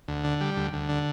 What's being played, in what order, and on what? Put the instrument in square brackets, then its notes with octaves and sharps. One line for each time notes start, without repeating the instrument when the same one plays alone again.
[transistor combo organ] D2
D3
G3
D2
D2
D3